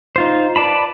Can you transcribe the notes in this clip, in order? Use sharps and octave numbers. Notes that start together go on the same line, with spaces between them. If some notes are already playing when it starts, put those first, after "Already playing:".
D#4 F4 C5
B4 D5 A5 B5